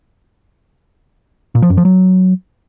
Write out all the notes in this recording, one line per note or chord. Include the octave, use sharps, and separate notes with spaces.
A#2
F3
F#2
F3
F#3